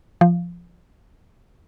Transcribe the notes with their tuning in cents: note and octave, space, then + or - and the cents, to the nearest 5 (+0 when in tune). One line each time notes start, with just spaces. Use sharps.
F3 -10